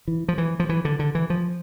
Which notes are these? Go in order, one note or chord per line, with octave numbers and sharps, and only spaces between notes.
E3
F3
E3
F3
E3
D3
D3
E3
F3